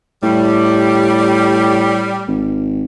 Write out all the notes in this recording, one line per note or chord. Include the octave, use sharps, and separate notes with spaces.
A2 G3
G#1